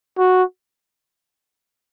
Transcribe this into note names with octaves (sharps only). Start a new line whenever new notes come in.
F#4